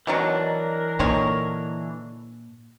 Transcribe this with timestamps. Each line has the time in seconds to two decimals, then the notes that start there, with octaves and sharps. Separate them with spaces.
0.07 B2 D#3 E3 F#3 D4 A#4
0.99 A#2 D3 D#3 C#5